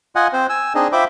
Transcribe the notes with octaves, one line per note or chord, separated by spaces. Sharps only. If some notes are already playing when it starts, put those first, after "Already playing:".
F4 D#5 F#5 G#5
C4 C5
G#5 E6
C4 D4 D#4 G#4 D#5
F4 C5 E5 G5 B5 D6